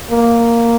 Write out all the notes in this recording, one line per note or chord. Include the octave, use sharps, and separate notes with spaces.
A#3